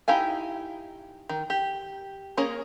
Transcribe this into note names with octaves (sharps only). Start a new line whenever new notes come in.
D#4 E4 G4 F5 G#5
D#3
G4
A#3 C#4 G#4 A#4 C#5